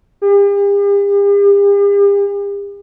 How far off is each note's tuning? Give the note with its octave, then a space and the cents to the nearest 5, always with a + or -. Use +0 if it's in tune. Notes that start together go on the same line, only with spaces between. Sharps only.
G4 +45